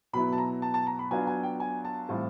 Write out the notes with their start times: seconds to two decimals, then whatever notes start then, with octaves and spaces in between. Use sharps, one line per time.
0.13 B2 F#3 B3 E4 B5
0.33 A5
0.38 A#5
0.62 A5
0.74 A5
0.87 A#5
0.99 B5
1.11 F#3 B3 D4 F4 G#5
1.27 G#5
1.43 G5
1.60 G#5
1.85 A5
2.09 A2 E3 G3 C4 F4